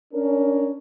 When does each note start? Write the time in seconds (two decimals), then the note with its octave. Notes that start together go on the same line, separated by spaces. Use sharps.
0.13 C#4 D4 A#4